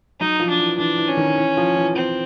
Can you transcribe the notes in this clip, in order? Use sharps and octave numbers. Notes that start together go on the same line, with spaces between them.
F#3 D#4
F3
D4
E3
E3 D4
E3
C#4
D#3
E3
F3
E3
C4